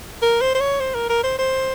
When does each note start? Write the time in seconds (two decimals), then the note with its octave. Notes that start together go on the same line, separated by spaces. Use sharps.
0.22 A#4
0.41 C5
0.55 C5
0.60 C#5
0.80 C5
0.94 A#4
1.09 A#4
1.24 C5
1.39 C5